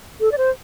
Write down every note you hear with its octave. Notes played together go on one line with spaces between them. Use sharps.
A4
D5
C5